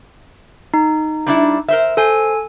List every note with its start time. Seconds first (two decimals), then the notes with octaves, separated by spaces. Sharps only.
0.74 D#4
1.27 G3 D4 E4
1.68 A#4 C5 E5
1.97 A4 C5 G#5